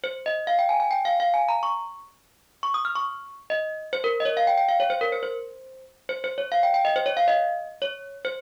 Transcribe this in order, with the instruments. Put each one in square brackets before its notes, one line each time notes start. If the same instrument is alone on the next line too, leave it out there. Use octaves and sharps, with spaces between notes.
[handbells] C5
D#5
F5
G5
G#5
G#5
G5
F5
F5
G#5
A#5
C#6
C#6
D#6
F6
C#6
D#5
C5
A#4
D#5
C#5
F5
G5
G5
F5
C#5
C5
A#4
C5
C5
C5
C5
C#5
F5
G5
G5
D#5
C5
C#5
F5
D#5
C#5
C5